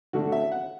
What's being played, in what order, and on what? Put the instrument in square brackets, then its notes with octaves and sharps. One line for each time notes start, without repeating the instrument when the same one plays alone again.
[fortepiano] D3 A3 F#4
E5
F#5